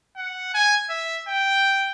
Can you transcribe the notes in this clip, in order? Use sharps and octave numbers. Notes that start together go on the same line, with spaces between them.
F#5
G#5
E5
G5